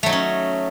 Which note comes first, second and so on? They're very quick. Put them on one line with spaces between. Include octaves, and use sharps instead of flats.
A3 F#3 D#4 C#4